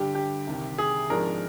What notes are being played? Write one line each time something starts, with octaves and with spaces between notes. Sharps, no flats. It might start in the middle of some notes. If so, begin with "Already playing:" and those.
Already playing: G2 D3 G3 D4 G4
G4
C2 C3 D#3
G#4
G#1 G#2 F3 G#3 D4 A#4